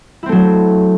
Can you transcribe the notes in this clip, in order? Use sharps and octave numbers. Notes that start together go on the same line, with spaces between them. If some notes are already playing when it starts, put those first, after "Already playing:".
F#3 A3 C4 E4